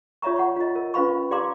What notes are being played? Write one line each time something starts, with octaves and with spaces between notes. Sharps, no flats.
F4 C#5 D5 E5 A#5 C#6
F#5 C#6
F4 D#5
A#4
C#4 F4 B4 F5 B5 C#6
G4 D5 F5 A#5 C6 D6